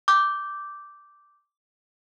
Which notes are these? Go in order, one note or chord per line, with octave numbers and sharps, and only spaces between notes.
D6 G6